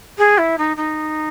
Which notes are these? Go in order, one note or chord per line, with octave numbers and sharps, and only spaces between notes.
G#4
E4
D#4
D#4